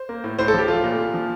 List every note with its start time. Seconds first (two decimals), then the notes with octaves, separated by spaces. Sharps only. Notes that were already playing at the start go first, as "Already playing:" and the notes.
Already playing: C5
0.09 A#3
0.24 A2
0.39 A2 C5
0.48 A4
0.53 F3 G4
0.68 A3 F4
0.84 A#2
0.98 A#2
1.14 F3